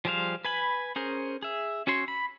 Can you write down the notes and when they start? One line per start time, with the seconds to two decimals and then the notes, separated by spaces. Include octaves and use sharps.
0.05 F3 G3 G#4 C5 F5
0.45 B4 G#5 B5
0.96 C#4 G#4 A#4 C5
1.43 G#4 E5
1.87 C#4 F#4 C#5 C6
2.08 B5